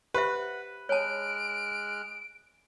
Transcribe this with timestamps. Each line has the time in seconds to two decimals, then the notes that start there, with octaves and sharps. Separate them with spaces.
0.14 G4 B4 C5 E5 F#5
0.89 G#3 C#5 A5 F6 F#6 D7